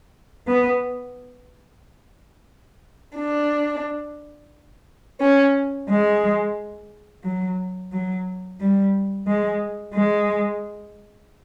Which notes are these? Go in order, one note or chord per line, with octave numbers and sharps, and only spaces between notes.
B3
D4
C#4
G#3
F#3
F#3
G3
G#3
G#3